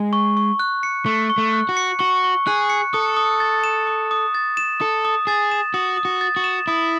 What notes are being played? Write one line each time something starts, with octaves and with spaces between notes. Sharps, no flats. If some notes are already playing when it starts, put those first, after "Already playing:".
Already playing: G#3
C#6
C#6
F#6
C#7
A3 C#6
C#6
A3
F#6
F#4
C#7
F#4 C#6
C#6
G#4 F#6
C#7
A4 D#6
D#6
A6
E7
D#6
D#6
A6
E7
A4 D#6
D#6
G#4 A6
E7
F#4 D#6
D#6
F#4
A6
F#4
E7
E4 D#6